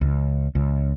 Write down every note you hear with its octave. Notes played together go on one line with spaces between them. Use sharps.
C#2
C#2